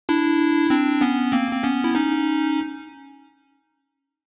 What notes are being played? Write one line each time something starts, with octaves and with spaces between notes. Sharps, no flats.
D4 E4
C4 D4
B3 C#4
A#3 C4
C4
B3 C#4
E4
C#4 D#4